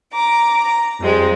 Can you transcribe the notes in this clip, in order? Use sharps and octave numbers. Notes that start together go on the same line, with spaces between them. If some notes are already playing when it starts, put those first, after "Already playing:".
A#5 D6
A#5
F2 F3 G3 G#3 C4